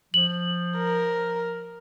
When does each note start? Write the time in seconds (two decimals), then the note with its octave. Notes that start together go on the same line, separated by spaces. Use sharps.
0.14 F3 F#7
0.77 A#4